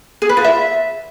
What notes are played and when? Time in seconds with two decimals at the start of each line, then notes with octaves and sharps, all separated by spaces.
0.22 G#4
0.29 B4
0.37 F4
0.44 E5